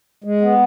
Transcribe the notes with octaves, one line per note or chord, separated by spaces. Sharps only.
G#3
B3